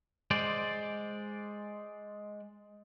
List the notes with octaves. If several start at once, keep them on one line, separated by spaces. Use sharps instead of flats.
G#3 C5 D5